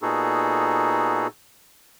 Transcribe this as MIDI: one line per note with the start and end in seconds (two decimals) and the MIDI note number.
0.02 1.27 46
0.02 1.27 59
0.02 1.27 63
0.02 1.27 66
0.02 1.27 68
0.02 1.27 69